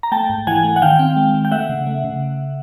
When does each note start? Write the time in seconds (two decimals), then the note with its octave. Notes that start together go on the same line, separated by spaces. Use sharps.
0.03 A#5
0.12 A3 G5 A5
0.30 G#2
0.47 E3 F#5 G#5
0.64 A3
0.76 F#5
0.82 D#3 F5 G5
0.99 C4
1.16 G#3
1.34 D#3
1.45 G5
1.51 A3 E5 F#5
1.69 C#3
1.87 A3
2.04 C#3